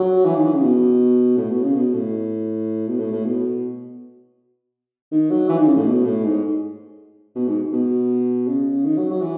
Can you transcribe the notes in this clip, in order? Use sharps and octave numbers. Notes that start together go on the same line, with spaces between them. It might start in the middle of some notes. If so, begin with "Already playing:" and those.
Already playing: F#3
E3
D#3
E3
C#3
B2
A2
B2
C#3
B2
A2
B2
A2
A2
B2
D#3
F#3
E3
D#3
C#3
A2
B2
A2
G#2
B2
G#2
B2
C#3
D#3
F#3
F#3
E3